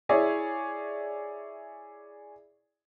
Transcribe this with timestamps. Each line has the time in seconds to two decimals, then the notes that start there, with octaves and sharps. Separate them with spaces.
0.09 E4 G#4 C#5 D5 E5